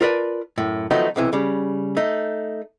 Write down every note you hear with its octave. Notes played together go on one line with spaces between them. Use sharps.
F4 A#4 B4 D5 A5
F#2 A2
D#3 F3 F#3 A3 B3 D#4
B1 C3 E3
C#3 G3
A3 D#4